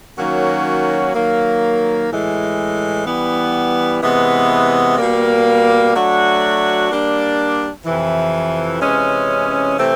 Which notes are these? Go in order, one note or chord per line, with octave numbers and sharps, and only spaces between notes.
D#3 F#3 A#3 C#4 F#4
D#3 F#3 A#3
A2 E3 G#3
E3 G3 B3
C3 E3 G#3 B3
B2 G3 A#3
F#3 A3 D4 F#4
G3 A#3 D4
F2 C3 E3
C3 E3 G#3 C#4
C3 E3 A3 C4